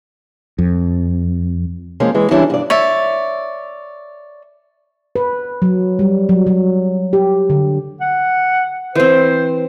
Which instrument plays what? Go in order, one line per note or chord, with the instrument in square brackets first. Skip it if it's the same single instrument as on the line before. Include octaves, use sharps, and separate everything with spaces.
[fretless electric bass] F2
[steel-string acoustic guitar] F3 G#3 A#3 C#4
E3 G#3
E3 G3 C#4 D4 E4
G2 D5
[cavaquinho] C#5 D5 E5
[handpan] B4
F#3
G3
F#3
F#3
G4
D3
[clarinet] F#5
[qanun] E3 C4 [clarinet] C5